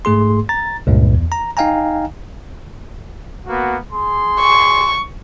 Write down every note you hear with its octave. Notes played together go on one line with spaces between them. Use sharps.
G#2 A3 G#4 C6
A#5 A6
C#2 G2 A#2
E2
A#5
D#4 D#5 F5 G5 G#5 A#5
A#3 B3 F#4
G#4 C6
C#6